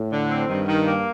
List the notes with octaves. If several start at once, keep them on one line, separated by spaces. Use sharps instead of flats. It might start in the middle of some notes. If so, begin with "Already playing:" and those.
Already playing: A2
D3
C4
G2 D#3
D#3
A#3